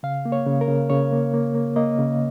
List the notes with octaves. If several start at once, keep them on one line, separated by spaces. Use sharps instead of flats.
C#3 F5
A#3
C#5
C#3
A#4
C#3
C#3 C#5
A#3
A#3
A#3
A#3 D#5
C#3